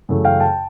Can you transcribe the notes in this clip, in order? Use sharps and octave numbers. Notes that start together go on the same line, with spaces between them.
F#2 C#3 E3 A3
F5 G5
G5 A5